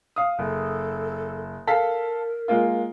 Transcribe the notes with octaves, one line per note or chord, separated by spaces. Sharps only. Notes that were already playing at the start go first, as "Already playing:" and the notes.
F5 D#6
F#1 A4
A4 A#4 F5 B6
G#3 A#3 F4